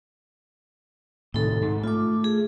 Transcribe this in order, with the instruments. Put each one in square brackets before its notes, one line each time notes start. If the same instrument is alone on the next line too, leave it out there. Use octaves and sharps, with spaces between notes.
[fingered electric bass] A2 C3 D#3 [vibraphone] D#4 A4
[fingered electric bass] G#2
[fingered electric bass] A3 [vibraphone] F4 D6
[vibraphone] G#4